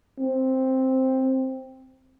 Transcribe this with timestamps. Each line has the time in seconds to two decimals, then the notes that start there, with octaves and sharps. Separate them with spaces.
0.20 C4